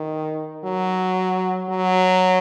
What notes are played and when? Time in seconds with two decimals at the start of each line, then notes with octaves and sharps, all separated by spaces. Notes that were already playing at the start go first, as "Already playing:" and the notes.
Already playing: D#3
0.64 F#3
1.70 F#3